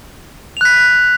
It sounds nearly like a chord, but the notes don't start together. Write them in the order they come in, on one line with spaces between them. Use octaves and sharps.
F7 F#6 B6